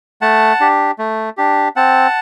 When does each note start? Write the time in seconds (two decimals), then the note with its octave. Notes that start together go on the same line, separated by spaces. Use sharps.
0.21 A3 F#5 A5
0.60 D4 G4
0.99 A3
1.37 D4 G4
1.76 C4 F#5 A5